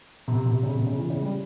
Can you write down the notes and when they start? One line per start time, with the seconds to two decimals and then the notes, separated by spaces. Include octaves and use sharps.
0.28 C3
0.46 C3
0.63 C#3
0.75 C3
0.87 C#3
0.98 E3
1.10 C#3
1.22 G3